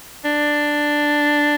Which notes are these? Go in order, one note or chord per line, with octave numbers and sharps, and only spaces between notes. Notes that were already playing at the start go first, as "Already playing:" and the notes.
D4